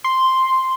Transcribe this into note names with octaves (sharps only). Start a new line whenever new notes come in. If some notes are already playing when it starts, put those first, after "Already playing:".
C6